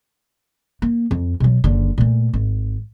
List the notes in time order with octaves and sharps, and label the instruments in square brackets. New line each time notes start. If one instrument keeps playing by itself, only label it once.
[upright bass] A#3
F2
B2 F#3
F#1 D3
A#2 A3
G#1